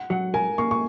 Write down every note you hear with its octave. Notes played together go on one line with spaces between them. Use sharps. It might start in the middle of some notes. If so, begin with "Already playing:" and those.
Already playing: F#5
F#3 F#5
A#4 G#5
A#3 C#6
C#6